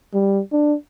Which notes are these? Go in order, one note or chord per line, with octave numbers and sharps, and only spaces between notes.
G3
D4